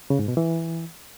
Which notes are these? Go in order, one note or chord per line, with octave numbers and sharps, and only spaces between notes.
C#3
G#2
B2
E3